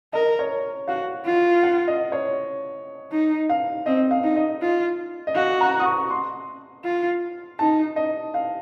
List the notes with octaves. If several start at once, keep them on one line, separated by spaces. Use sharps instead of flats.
A#4 D#5
C#5
F#4 F5
F4
F#5
D#5
C#5
D#4
F5
C4 D#5
F5
D#4
D#5
F4
D#5
F#4 F5
A#5
D#6
C#6
C6
F4
D#4 A5
D#5
F5